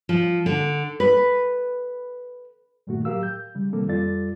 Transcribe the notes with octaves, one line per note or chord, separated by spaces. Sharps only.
F3
D3
B4
G2 A#2 D#3 A3 A#3 F#4
A2 F#3 G4 A#4 F5 E6
G6
C#3 G3
C3 D#3 G3 A#3 C4 A4
F2 G3 F4 A4 D5 A6